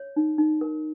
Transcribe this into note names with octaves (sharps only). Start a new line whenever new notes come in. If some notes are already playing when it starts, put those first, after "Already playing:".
Already playing: C#5
D#4
D#4
A#4